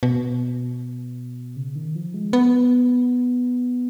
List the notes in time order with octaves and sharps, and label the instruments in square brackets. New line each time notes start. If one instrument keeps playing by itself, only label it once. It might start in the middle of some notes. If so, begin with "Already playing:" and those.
[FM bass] B2
C#3
D#3
F3
G#3
B3